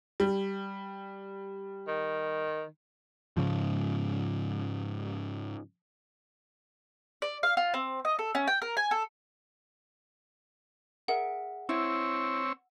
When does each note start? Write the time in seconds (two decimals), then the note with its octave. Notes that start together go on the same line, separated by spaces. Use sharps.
0.20 G3
1.88 D#3
3.37 G#2 C#3 F3
7.22 D5
7.43 F5
7.57 F4
7.74 C4
8.05 D#5
8.19 A4
8.35 C#4
8.48 G5
8.62 A#4
8.77 G#5
8.91 A4
11.08 G#4 A#4 E5 F#5
11.69 C4 E4 C#5 E6